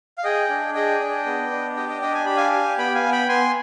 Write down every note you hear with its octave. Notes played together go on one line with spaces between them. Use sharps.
F5
G#4 D#5 G5
D4
G#4 D#5 G5
D4
B3
D4
G4 D#5 G5
D#5 G5
D4 D#5 G5
G#5
G4 B5
F5 G#5
G4
B3 G5 B5
F5 G#5
B3
G5 B5
B3 G#5 C6